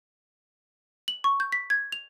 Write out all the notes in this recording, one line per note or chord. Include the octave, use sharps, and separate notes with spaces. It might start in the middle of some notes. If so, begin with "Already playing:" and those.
F#7
C#6
G6
B6
G#6
F7